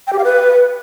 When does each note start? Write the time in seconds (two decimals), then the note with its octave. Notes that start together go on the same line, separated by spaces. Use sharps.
0.07 G5
0.13 G4
0.19 F5
0.24 B4